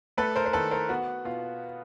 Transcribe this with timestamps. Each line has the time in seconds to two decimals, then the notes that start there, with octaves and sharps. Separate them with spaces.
0.17 A3 A4 B4
0.36 A#4 C5
0.46 C5
0.53 D#3 A4 B4
0.71 A#4 C5
0.89 B3 F#4
1.25 B2 F4